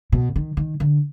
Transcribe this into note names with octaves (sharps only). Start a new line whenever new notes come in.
B2
D#3
D#3
D3